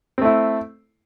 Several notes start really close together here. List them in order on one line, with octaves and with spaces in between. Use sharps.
C4 A3 E4